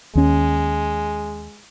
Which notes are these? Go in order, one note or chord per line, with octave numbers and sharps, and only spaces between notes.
D#2 G#3 C#4